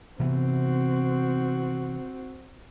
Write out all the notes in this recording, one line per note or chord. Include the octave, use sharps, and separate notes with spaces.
C3 E3 B3 C4 F#4